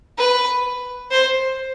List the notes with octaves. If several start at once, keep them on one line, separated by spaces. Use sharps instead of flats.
B4
C5